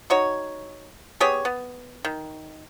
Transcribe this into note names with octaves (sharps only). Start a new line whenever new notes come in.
D#4 F#4 C#5
B3 G4 G#4 C#5
B3
D#3